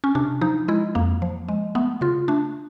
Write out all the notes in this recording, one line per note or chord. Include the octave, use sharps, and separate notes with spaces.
C#4
C3 D4
F3 D#4
G#3 E4
F2 A#3
F3
G#3
A3 B3
C#3 F4
A3 D4